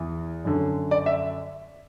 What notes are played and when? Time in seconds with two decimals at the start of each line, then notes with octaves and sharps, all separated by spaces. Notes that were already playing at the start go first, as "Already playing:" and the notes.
Already playing: E2 E3
0.45 F#2 D3
0.91 D5
1.06 E5